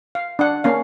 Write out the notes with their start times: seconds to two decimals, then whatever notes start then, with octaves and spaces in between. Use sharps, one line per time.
0.15 F5
0.39 D4 F#5
0.64 A#3 C#4 F5